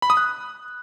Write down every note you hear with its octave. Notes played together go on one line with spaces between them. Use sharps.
B5
D#6
F#6